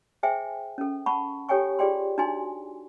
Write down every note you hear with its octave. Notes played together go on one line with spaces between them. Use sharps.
G#4 C5 E5 G5 G#5
C#4 A4
F#5 A5 B5 C#6
G4 A4 C#5 G5 G#5 C#6
F4 G4 G#4 D5 G5 C6
D4 D#4 F#4 G#5 C6